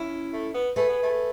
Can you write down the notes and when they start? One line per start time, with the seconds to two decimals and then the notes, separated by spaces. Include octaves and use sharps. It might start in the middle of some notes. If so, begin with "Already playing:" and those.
Already playing: C#4 E4
0.33 A3
0.54 B3
0.76 A3 G#4 B4
0.89 B3
1.03 A3